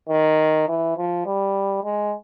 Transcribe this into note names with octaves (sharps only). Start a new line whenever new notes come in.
D#3
E3
F3
G3
G#3